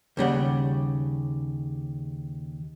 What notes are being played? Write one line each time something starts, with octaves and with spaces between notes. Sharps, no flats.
D#2 C#3 G3 F#5